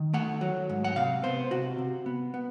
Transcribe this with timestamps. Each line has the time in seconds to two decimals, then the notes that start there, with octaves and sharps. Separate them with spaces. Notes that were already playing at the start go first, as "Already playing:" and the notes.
Already playing: D#3
0.14 A3 F#5
0.41 F#3
0.70 G#2
0.84 F#5
0.96 C3 F5
1.23 B3 C5
1.51 C3 F#4
1.78 C3
2.06 B3
2.34 B3